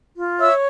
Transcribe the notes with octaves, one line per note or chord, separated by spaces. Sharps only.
F4
C#5 E5 E6